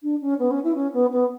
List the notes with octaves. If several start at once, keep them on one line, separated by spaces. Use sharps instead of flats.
D4
C#4
B3
C#4
E4
C#4
B3
B3